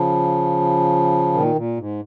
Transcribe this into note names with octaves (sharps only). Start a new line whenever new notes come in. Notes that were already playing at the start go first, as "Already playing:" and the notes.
Already playing: C#3 F3
A#2 D#3
A#2
G#2